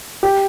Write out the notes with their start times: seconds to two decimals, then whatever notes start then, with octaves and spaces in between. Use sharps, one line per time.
0.23 G4